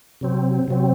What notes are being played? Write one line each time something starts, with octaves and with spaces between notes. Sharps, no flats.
C3 F#3 C4
C3 F#3 C4